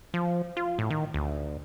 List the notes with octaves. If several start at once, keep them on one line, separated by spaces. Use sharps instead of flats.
F3
F4
A2
D#3
D2